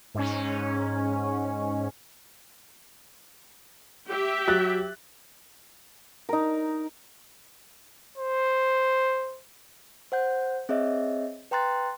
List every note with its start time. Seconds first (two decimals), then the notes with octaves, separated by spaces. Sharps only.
0.15 G#2 C#4
4.09 G4 E5
4.47 F#3 F#6 A6
6.29 D#4 A#4
8.18 C5
10.12 C5 F#5 G6
10.69 C4 G#4 C#5 D#5 E5
11.51 B4 G5 A#5 C6 F#6 A6